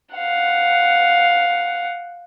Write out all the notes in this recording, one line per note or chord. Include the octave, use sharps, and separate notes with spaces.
F5 F#5